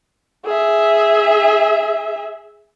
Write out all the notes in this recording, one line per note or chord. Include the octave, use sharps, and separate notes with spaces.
G#4 E5